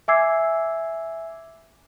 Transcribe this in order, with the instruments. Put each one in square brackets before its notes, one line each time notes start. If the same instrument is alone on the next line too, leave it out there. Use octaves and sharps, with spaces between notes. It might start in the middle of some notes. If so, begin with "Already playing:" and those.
[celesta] E5 G#5 D6 E6 G#6 C7